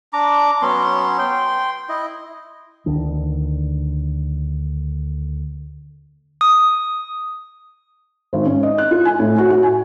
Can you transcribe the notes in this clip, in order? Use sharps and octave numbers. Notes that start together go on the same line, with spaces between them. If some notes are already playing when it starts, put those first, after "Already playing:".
D4 A#5 D6
F#3 B3 C#4 C6
G5 C6
E4 D#5
D2 D#3 D4
D#6
G#1
C#4
D#5
F#6
F4
G#5
A2
F#4
F#4
G#5